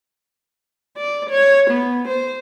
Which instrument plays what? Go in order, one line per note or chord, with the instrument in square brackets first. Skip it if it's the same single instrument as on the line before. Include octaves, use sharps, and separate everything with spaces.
[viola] D5
C#5
B3
C5